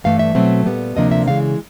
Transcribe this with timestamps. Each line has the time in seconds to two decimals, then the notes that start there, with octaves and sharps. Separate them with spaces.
0.04 G2 E3 A3 F5
0.19 E5
0.35 B2 F#3 A3 C4
0.66 A#2 G3 B3
0.97 D2 C3 F3 A#3 D4 D#5
1.11 E5
1.27 C#3 E3 G#3 F5